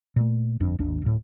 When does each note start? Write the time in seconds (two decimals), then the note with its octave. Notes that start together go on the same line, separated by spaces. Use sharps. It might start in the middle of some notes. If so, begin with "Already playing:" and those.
0.16 A#2 A3
0.60 G1 F2 D4
0.79 G#1 D#2 D4
1.02 D1 A2